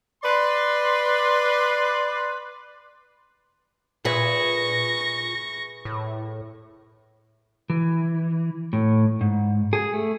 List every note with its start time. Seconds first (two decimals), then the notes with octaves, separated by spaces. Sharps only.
0.24 B4 D5 C6
4.05 A#2 G#4 B4 E5 C#6 A#6
5.85 A2
7.70 E3
8.73 A2
9.21 G#2
9.73 G#4
9.94 A3